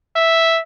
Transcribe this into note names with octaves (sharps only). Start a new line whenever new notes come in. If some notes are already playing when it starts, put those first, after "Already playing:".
E5